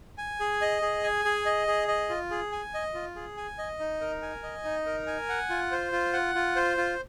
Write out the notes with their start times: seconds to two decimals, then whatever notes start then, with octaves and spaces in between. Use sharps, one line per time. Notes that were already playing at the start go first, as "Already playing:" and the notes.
0.18 G#5
0.40 G#4
0.61 D#5
0.82 G#4
1.04 G#5
1.25 G#4
1.46 D#5
1.67 G#4
1.88 D#5
2.09 F4
2.31 G#4
2.52 G#5
2.74 D#5
2.94 F4
3.16 G#4
3.37 G#5
3.58 D#5
3.79 D#4
4.01 A#4
4.22 G#5
4.43 D#5
4.64 D#4
4.86 A#4
5.07 G#5
5.29 F#5
5.50 F4
5.71 C5
5.92 F4
6.13 F#5
6.35 F4
6.56 C5
6.77 F4